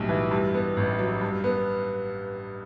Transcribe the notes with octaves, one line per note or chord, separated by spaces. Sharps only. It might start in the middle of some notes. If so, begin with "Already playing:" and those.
Already playing: B1 A2 G3
E3
G2
B3
A1
F#3
G2
B3